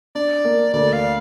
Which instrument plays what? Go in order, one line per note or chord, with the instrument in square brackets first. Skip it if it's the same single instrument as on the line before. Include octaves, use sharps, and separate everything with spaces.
[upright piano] D4 [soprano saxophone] D5
[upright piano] A#3
[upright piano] D2 [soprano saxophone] D5
[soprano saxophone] F5